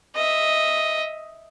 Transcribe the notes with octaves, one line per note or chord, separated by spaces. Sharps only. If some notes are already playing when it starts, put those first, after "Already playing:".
D#5 E5